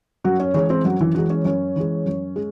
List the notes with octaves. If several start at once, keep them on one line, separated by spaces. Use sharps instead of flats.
F#2 F#3 F#4
C#4 C#5
E3 G#3 C#4 C#5
C4 C5
F#2 F#3 F#4
E3 E4
E3 F#3 G#3 F#4
C#4 C#5
F#2 C#4 C#5
E3 G#3
F#2
G#3